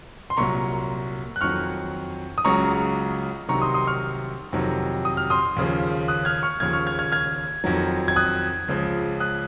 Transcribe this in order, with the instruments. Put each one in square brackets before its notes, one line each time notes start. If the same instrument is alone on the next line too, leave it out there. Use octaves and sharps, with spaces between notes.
[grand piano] C6
C2 A#2 F#3 A#5 C#6
F#6
F2 D#3 F#3 C#6 F6
D#6
C#2 C#3 F#3 A#5 C#6
C2 C3 D#3 F#3 A#5 C#6
C6 D#6
C6 D#6
C#6 F6
F2 C3 D#3 F#3
D#6
F6
C6 D#6
D#2 C#3 F3
D#6 F#6
F6 G#6
C#6 F6
D#2 C#3 F3 F6 G#6
C#6 F6
F6 G#6
F6 G#6
F6 G#6
F2 D#3 F#3
G#6
D#6 F#6
C#2 C#3 F3
D#6 F#6